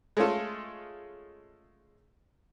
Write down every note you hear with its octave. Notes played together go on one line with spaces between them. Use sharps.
G#3 A3 C#4 F4 A4